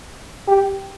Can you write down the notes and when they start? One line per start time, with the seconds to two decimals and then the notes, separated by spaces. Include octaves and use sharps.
0.48 G4